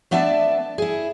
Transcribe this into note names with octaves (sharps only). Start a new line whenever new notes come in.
A3 B3 D4 D5 E5 A5
E4 G#4